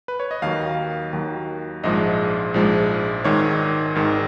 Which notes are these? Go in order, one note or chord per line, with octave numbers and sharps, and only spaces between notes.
B4
C#5
D#5
D#2 D#3 F#3 F5
D#2 D#3 F#3
A#1 G#2 F3 G#3 D#5
A#1 G#2 F3 G#3
G#1 G#2 D#3 C#5
G#1 G#2 D#3